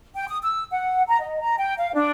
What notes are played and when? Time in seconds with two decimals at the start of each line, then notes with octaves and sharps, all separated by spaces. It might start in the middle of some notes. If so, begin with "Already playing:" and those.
0.15 G5
0.27 D#6
0.42 E6
0.71 F#5
1.08 A#5
1.20 D#5
1.41 A#5
1.57 G5
1.78 F5
1.94 D4